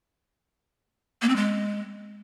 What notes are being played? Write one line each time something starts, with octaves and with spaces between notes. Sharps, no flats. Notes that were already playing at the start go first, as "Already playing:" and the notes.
A#3
C4
G#3